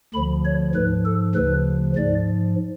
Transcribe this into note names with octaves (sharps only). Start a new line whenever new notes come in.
D2 D3 F3 B5
C#5
G#2 F3 B4
A4
D2 C#3 F3 B4
G#2 F3 D5